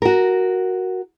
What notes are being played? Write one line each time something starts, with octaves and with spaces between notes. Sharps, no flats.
F#4 A#4